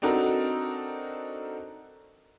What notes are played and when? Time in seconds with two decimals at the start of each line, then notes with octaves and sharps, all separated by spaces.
0.02 C4 D4 D#4 F#4 A4 A#4